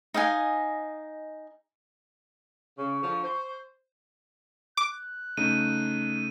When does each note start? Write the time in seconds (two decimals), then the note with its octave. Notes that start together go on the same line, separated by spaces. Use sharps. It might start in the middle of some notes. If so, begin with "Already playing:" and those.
0.14 D#4 D#5 F5 G#5
2.78 C#3 C#6
3.03 D3 F3
3.24 C5
4.77 D6 F#6
5.37 C#3 A3 D#4 D#7